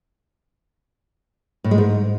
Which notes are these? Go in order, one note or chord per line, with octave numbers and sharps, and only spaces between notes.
A2
G#3
G#2